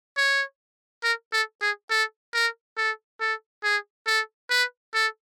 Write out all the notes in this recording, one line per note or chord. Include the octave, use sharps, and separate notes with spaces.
C#5
A#4
A4
G#4
A4
A#4
A4
A4
G#4
A4
B4
A4